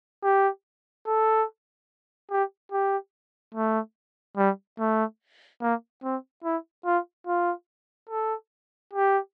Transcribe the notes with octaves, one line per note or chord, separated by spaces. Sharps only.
G4
A4
G4
G4
A3
G3
A3
A#3
C4
E4
F4
F4
A4
G4